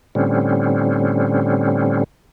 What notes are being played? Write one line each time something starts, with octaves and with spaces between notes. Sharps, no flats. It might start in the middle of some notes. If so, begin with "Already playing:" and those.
A2 D3 G3 C4 C#4